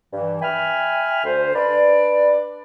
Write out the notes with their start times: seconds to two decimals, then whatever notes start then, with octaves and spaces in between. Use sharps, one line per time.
0.13 G2 E3
0.41 E5 G5 G#5 B5 F6
1.25 D2 C5
1.54 D4 B4 D5